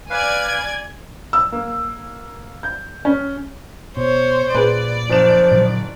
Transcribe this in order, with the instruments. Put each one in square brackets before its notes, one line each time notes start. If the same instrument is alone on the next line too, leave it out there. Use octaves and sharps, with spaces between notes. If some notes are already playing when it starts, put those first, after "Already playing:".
[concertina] B4 F5 [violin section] D5 G#5 G#6
[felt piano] E6
A#3
G6
C#4
[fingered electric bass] B2 [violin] C5 C#5
[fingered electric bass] A#2 [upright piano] G#4 B4 [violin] D5
[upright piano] F#1 E7 [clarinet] F3
[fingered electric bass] A#2 D3 F#3